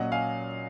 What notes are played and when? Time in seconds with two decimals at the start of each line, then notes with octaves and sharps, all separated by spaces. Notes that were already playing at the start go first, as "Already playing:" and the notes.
Already playing: A#2 F#3 C#4 D#5 F#5
0.12 F5 G#5